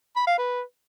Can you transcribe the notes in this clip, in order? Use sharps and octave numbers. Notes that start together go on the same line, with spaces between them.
B5
F5
B4